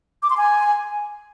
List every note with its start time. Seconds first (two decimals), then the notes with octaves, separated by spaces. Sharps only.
0.23 D6
0.30 C6
0.37 G#5